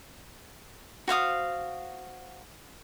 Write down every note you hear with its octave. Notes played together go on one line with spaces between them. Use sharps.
F#4 C5 F5 D#6